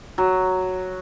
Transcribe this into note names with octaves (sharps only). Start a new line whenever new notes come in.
F#3